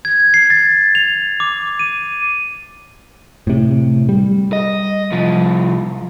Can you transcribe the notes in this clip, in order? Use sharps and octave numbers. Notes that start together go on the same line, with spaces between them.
G#6
C7
A6
F7
D6
D#7
A2 C3
G3
D#5
C2 F3